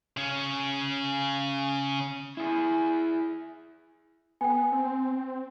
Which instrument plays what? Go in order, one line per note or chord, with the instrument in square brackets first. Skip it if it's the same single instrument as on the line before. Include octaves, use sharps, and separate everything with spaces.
[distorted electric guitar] C#3 C#4
[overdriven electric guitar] E4 G#4
[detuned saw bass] B3 [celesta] G5 G#5
[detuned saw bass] C4